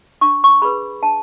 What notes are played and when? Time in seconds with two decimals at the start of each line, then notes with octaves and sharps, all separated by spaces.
0.21 D4 C#6
0.44 C#6
0.62 G#4 B4 B5
1.02 D4 A5